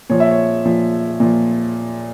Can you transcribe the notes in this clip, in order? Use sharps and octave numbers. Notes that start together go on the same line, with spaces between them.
A#2 F3 C#5
E5
C#5
A#2 F3
A#2 F3